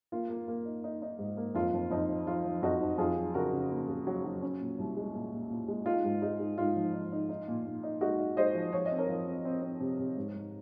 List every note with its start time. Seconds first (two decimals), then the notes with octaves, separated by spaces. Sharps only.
0.12 A#3 F4
0.30 A#3
0.48 A#3
0.65 D#4
0.84 D#4
1.02 D#4
1.19 G#2
1.37 A#3
1.55 F2 F4
1.73 F2
1.91 F2 D#4
2.08 F3
2.26 F3 F4
2.45 F3
2.62 F2 D#4 F#4
2.81 F2
2.98 F2 F4 G#4
3.16 F#3
3.34 C#3 F#4 A#4
3.53 C#3
3.71 A#3
3.88 C#3
4.07 F#3
4.24 F#3
4.42 C#4
4.61 A#2
4.78 C2
4.97 G#3
5.15 A#2
5.32 A#2
5.50 A#2
5.68 G#3
5.85 D#4 F4
6.04 G#2
6.22 G#3 D#4
6.40 G#3
6.58 G#2 F4
6.76 F3
6.93 D#4
7.12 D#4
7.29 D#4
7.48 A#2
7.66 A#2
7.83 D#4
8.01 G#3 D#4 F#4
8.19 D#4
8.37 G#3 C5 D#5
8.55 F3
8.73 F3 C#5
8.86 D#5
8.91 C4
8.98 A#4 C#5
9.08 F3
9.26 C4
9.45 C4
9.62 C4
9.80 C3
9.99 C3
10.17 G#2
10.34 G#2